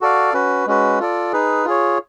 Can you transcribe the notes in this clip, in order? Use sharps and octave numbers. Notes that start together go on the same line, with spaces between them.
F#4 A4 D5 F5
C#4 F#4 B4
G#3 C#4 F#4 B4
F4 A4 D5
D#4 G#4 B4
F4 G#4 C#5